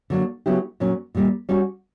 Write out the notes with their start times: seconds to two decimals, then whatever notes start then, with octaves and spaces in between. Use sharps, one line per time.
0.10 D3 F#3 A#3 D4
0.46 C#3 F#3 B3 E4 G4
0.80 A#2 F#3 C#4
1.15 A#2 G3 A#3
1.49 G3 C#4 F#4